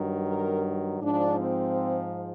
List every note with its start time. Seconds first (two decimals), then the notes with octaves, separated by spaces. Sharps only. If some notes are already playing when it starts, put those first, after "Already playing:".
Already playing: G2 D#3 F#3
0.27 A#4
1.02 G#2 F3 D4
1.39 C4